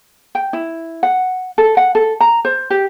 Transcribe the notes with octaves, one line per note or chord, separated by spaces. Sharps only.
G5
E4
F#5
A4
F#5
A4
A#5
C5
G4